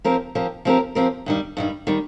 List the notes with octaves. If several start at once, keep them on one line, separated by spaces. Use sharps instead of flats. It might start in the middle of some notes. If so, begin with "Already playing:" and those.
F3 C4 G4 A#4
F3 C4 G4 A#4
F3 C4 G4 A#4
F3 C4 G4 A#4
G2 D#3 G3
G2 D#3 G3
D#3 G3